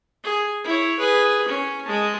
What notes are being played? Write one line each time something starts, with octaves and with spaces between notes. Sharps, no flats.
G#4
E4 C#5
G#4 B4
C#4
G#3 A5